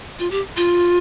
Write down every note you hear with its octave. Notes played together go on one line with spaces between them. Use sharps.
F4
G4
F4